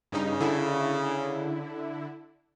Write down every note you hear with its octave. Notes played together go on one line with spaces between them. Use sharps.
G2 C#3 D#4
D3 E4